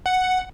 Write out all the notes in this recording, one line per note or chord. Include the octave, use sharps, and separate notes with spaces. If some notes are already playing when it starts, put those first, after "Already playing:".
F#5